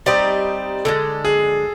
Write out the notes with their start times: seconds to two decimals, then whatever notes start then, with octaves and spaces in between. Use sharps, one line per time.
0.06 G3 C4 D#4 D5
0.85 D3 F3 G#3 A4
1.25 G#4